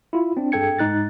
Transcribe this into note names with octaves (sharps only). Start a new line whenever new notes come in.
E4 F4
C4 D4
G2 G#4 A4 G5 G#6 C#7
G#2 D#4 F#6 A6